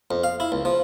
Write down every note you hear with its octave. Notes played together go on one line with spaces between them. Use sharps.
F2
F5
E4
C#2
F3